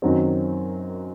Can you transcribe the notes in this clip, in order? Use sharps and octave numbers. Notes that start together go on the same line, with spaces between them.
F#2 D#3 F#3 C4